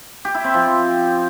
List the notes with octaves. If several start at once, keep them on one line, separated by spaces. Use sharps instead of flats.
G4
E4
C4
F3